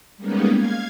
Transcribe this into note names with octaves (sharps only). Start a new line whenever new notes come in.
G3 G#3 A#3 B3 C#4 D#4
F5 G#6